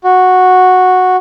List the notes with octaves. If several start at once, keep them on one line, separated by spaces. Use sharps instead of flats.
F#4